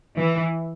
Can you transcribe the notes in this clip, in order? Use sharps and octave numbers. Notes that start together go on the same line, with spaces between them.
E3